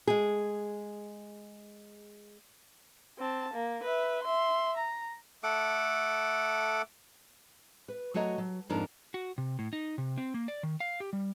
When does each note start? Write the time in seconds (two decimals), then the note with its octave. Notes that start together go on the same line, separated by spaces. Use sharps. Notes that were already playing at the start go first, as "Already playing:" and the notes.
0.07 G#3 G#4
3.18 C4 A5
3.53 A#3
3.83 B4 E5
4.23 E5 C6
4.77 A#5
5.43 A3 A4 F#5 D6
7.88 B4
8.14 F#3 A3 F#4 C#5 D#5 A#5
8.38 F#3
8.69 F2 G#2 F3 D4 D#4 A#4
9.14 F#4
9.38 C3
9.59 A2
9.73 D#4
9.98 C3
10.18 C4
10.34 A#3
10.48 D5
10.63 D#3
10.80 F5
11.00 G4
11.13 G3